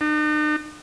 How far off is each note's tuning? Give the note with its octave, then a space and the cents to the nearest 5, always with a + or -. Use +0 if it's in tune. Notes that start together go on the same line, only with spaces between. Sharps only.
D#4 -45